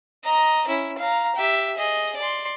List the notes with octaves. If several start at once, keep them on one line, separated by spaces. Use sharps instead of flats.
D#5 A#5
C#4 E4
F5 A#5
G4 E5
G#4 D#5
D5 C6